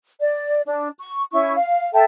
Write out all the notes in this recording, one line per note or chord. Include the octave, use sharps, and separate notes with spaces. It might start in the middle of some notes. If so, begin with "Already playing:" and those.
D5
D4
C#6
C#4 E4 C#6
F5
A4 E5 G5 A5